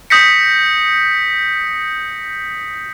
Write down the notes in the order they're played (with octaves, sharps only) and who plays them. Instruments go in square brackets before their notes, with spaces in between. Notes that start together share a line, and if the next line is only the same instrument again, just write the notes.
[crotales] D#6 G6 A#6 B6 C#7